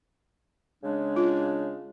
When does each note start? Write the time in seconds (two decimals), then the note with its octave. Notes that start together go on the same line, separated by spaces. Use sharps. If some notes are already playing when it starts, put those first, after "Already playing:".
0.84 C#3 G#3 D4
1.16 F4